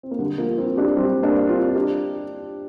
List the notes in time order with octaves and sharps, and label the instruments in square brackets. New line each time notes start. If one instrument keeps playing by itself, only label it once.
[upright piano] C4
A#3
D3 G3
F3 A#3
C4 F4
D4 G4
G3 C4
A#3 D4
C4 F4
D4 G4